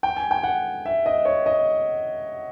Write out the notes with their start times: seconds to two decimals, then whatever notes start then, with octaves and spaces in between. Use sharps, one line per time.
0.03 G5
0.17 G#5
0.31 G5
0.43 F#5
0.86 E5
1.06 D#5
1.25 C#5
1.46 D#5